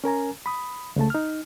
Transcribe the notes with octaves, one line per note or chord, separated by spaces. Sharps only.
C#4 A#4 G#5 A#5
B5 D#6
C#2 C#3 A3 A5
D#4 F6